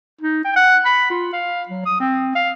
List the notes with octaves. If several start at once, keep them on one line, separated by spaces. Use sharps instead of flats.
D#4
G5
F#5
B5
F4
F5
F#3
D#6
C4
F5